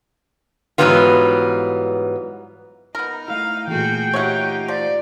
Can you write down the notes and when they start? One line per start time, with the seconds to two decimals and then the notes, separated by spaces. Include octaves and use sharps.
0.78 G#2 E3 F#3 G3 B3 F4
2.95 B3 D#4 A#4
3.28 A3 E4 F5
3.67 A#2 E3 A3 F#4 G#4 G5
4.14 D#4 F4 G4 C#5 E5 F#5
4.68 F3 D5